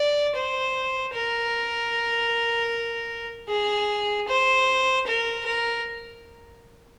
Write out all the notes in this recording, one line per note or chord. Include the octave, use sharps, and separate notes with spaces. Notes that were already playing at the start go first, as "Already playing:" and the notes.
Already playing: D5
C5
A#4
G#4
C5
A#4
A#4